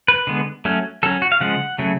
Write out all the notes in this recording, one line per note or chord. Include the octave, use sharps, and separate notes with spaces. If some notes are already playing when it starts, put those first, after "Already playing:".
B4
D3 G#3 B3
F#3 A3 C#4
F#3 C#4 A4
F#4
F5
C#3 F3 G#3 F#5
C#3 F#3 A3